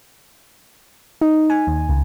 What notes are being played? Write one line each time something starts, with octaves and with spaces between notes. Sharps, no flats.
D#4
G#5
D#2
C#2